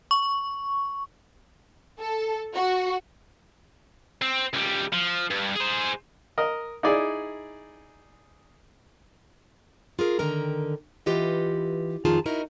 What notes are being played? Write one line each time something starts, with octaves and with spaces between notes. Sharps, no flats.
C#6
A4
F#4
C4
C#2 G3
F3
G2
G#4 C5
A#4 D#5
D#4 E4 G#4 D5
F4 G#4 A#4
D3 D#3 A#4 G5 A#5
E3 F4 G4 B4 D#5 F#5
F2 D#3 F4 G#4 A5 A#5
D#4 E4 F#4 A#4 D#5